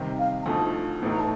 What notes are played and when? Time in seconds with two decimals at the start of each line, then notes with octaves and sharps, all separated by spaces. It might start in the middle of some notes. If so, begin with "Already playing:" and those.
Already playing: C3 D#3 G3 C4
0.18 F5
0.42 A#5
0.46 D2 D3 F3 A3 D#4 A5
1.02 A1 A2 A3 D#4
1.10 A#5
1.19 A5